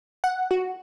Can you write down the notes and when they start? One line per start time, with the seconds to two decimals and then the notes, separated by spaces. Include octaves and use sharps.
0.24 F#5
0.51 F#4